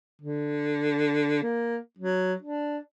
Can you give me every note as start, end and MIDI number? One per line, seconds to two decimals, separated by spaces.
0.22 1.40 50
1.43 1.77 58
1.99 2.34 54
2.43 2.78 62